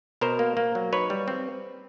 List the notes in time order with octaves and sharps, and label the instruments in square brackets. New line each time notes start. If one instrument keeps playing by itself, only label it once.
[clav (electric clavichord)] B2 A#4 C5
A#3
A#3
F#3
D#4 B4 C#5
G3
C4